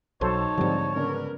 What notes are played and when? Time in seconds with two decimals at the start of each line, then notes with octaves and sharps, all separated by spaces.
0.21 B1 F#3 D#4 A4 C5 C#5 A5
0.58 G#2 D3 F3 G3 C4
0.96 C#3 B3 D4 A#4 B4